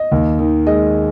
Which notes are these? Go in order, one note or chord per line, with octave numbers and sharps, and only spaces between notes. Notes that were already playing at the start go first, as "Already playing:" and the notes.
Already playing: D#5
D#2
D#3
G#3 D#5